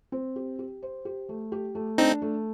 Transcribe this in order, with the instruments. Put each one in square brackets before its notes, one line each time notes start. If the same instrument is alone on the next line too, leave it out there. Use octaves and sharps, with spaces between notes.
[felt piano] C4
G4
G4
C5
G4
A3
G4
A3
[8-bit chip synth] C4 D#4 [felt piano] D4
[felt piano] A3